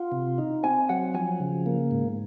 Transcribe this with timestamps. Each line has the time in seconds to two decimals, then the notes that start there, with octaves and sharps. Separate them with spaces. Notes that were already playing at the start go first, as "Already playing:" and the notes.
Already playing: F4 F#5
0.12 C3
0.38 D#4
0.63 C4 G#5
0.89 F#3 F#5
1.14 F3 G#5
1.40 C#3
1.66 A#3
1.91 G#2